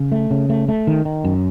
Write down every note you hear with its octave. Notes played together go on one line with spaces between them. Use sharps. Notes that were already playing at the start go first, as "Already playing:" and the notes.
Already playing: C#3
A3
C#3
A3
A3
D#3
D#3
F#2